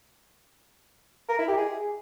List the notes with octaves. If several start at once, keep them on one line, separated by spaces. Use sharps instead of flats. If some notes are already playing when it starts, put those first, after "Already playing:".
A#4
E4
G4
G#4